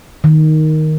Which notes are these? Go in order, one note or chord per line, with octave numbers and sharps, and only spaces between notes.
D#3